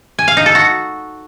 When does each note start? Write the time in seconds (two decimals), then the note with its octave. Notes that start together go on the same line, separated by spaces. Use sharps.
0.19 G#5
0.28 F5
0.37 D#4
0.46 A4
0.55 F#4